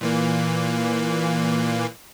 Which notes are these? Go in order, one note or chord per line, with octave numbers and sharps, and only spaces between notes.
A#2 E3 A#3